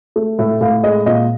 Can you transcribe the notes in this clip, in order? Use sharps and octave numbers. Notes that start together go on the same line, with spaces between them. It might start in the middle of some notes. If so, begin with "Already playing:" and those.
A3
A2 E5
A2 F5
G#3 D#5
A#2 D#5